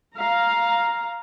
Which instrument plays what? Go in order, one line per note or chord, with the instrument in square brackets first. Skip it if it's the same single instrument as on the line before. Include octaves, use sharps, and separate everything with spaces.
[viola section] F5 A#5